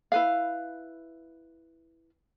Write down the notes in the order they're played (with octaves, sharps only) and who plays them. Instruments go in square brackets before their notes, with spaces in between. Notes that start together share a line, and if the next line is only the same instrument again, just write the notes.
[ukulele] E4 B4 F5